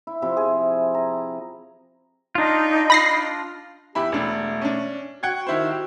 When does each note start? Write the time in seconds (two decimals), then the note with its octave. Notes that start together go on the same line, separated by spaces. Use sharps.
0.07 E4
0.22 C3 F3 E4
0.37 G#4
0.95 A#5
2.35 D4 D#4 F4
2.90 B5 A#6 C7
3.95 E2 E4 G4 B5
4.12 E1 A3 D4
4.61 C#4 D4
5.23 F#4 F#5 G5 G#6
5.47 D#3 E4 C5
5.70 G4